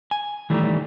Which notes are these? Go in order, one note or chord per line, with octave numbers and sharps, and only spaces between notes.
G#5
D#3 E3 G3 A3